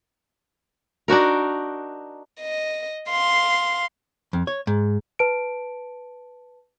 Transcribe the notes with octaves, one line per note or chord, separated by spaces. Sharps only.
D4 D#4 F#4 A#4
D#5
F5 C6
F2
C#5
G#2
B4 A5 D7